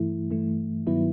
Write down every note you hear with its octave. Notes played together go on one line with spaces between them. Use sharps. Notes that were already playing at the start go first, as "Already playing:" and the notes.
Already playing: G2 E3 A3 E4
G2 E3 A3
G2 D#3 F#3 B3 E4